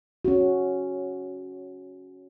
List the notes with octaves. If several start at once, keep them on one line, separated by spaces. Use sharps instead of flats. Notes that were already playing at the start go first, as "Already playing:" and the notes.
C#4 F#4